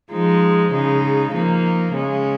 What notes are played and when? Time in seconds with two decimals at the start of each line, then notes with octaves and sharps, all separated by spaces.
0.11 F3 G#3 D#4
0.72 C#3 G#3 D#4
1.32 F3 A#3 D#4
1.92 C#3 G#3 C#4